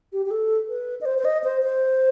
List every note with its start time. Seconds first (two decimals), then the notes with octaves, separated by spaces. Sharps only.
0.13 G4
0.26 G4
0.31 A4
0.69 B4
1.01 D#5
1.05 C5
1.18 C5
1.25 D#5
1.44 C5
1.63 C5